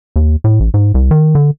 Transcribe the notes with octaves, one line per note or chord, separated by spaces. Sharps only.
D#2
A2
A1
G#2
C2
D#3
D3